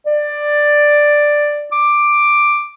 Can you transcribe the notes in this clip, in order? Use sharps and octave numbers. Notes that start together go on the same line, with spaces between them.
D5
D6